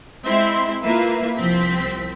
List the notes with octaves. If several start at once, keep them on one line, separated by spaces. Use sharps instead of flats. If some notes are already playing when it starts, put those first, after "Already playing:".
G#3 C4 E4 E5 C6
A#3 E4 F4 A#4 B4 E5
C2 F3 C4 B6